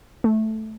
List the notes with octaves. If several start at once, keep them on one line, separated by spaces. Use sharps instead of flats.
A3